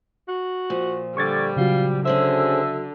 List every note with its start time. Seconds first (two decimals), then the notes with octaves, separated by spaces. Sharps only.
0.28 F#4
0.70 A#2 F3
1.17 D3 G3 C#6 G#6 A6
1.57 C#3 F#3 F4 F#4
2.05 D3 C#4 G#4 C5 E5